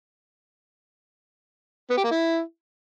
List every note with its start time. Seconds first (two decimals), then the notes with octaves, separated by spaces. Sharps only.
1.90 B3
1.97 G4
2.04 A#3
2.11 E4